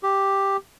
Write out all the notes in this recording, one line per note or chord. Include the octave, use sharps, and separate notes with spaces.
G4